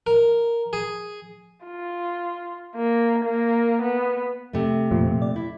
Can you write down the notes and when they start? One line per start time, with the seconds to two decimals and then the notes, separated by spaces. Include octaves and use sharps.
0.07 A#4
0.73 G#4
1.66 F4
2.76 A#3
3.25 A#3
3.82 B3
4.53 C3 A3
4.91 F2 A#2 F3
5.07 A#2
5.22 D5
5.36 E4